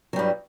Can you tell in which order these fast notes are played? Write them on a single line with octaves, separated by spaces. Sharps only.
F#3 G3 G2